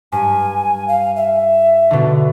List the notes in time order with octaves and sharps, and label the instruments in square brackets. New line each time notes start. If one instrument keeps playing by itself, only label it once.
[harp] G2 [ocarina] G#5
[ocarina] F5
E5
[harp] B2 D3